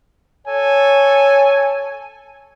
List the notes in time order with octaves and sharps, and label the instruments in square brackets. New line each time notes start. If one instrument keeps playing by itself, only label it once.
[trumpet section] A4 G#5 [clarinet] C#5